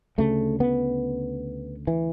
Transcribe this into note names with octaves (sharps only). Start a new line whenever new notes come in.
D2 C#3 A3
B3
E3